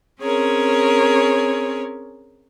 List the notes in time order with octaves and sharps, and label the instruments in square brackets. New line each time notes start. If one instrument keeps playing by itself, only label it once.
[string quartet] C4 C#4 G#4 A#4 C#5